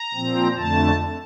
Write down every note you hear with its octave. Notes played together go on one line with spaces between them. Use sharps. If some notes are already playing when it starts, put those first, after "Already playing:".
Already playing: A#5
A#2 F3 C4
F2 D3 A3 A5